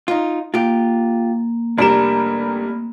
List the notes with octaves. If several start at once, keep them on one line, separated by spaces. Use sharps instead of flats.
D#4 F4
A#3 F4 G4
F1 G3 D4 A#4 E7